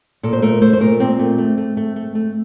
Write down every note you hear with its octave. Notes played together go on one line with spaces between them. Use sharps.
A#2 A4
C5
A3 A#4
A3 C5
C5
A#2 A#4
A#2 C4
A3
A3
A3
A3
A3
A3